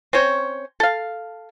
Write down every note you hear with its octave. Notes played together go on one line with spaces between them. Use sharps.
C4 C#4 C5 C#5
A4 F5